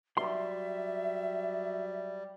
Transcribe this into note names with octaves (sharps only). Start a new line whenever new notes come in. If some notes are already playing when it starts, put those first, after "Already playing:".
F#3 G3 E5 C6